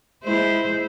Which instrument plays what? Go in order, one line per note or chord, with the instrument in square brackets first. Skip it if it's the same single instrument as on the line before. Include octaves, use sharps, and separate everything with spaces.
[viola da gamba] G#3 E4 C5